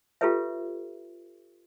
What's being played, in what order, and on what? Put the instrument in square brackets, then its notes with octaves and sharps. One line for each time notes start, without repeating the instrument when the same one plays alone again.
[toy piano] F4 G4 A4 B4 C#5 E5